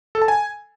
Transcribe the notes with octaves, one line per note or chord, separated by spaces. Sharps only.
A4
A5
G#5